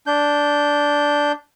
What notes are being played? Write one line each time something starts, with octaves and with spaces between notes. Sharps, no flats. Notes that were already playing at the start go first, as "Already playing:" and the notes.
D4 G6